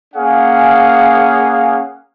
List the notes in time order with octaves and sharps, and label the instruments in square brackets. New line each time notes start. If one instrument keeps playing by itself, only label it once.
[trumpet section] A#3 C#4 G#4 F5 F#5 G#5